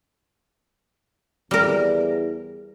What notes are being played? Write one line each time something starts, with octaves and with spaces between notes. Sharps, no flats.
E2 G3 A#4